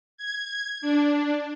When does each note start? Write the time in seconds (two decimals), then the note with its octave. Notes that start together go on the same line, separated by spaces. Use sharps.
0.17 G#6
0.81 D4